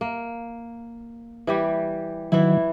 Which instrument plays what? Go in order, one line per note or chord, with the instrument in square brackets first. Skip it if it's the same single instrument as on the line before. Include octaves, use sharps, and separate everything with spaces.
[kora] A#3
E3 G3 G4
[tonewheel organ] D#3 F#3 [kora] E3 E4